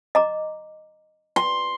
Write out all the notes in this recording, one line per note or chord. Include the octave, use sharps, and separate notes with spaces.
D#5 A#5 D6
C6